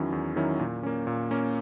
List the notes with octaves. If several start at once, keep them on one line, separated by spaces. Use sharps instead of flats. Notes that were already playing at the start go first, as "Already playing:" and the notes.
Already playing: E2 D#3 F#3 C#4 E4
E2
D#3 F#3 C#4 E4
A#2
A#3 C#4
A#2
A#3 C#4